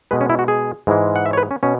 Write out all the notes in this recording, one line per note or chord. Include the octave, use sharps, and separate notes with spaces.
B2 G#3 B4
C#4
E4
F#4
G#4
G#2 E3 G#3
F#5
E5
C#5
B4
C#4
B2 C#4